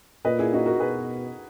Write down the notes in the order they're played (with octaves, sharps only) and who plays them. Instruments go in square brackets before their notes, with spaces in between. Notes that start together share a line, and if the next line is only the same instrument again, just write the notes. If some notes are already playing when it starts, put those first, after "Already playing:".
[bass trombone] A#2 [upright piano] B4 D#5
[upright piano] E4 G#4
D#4 F#4
F#4 A#4
[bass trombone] B2 [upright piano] G#4 B4